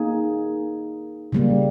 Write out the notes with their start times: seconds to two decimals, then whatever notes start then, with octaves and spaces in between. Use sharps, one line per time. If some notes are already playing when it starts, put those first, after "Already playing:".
Already playing: A#3 D#4 G#4
1.32 C#3 G3 A#3